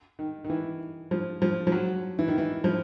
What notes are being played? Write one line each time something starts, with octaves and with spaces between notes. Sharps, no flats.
D#3
D#3
E3
F3
F3
F3
F#3
E3
D#3
E3
F3